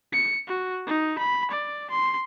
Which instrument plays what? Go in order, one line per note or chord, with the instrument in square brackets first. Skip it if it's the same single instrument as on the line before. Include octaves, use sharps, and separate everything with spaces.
[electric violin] C#7
F#4
D#4
B5
D5
C6